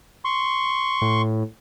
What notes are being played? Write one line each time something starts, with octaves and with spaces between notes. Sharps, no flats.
C6 C#6
A2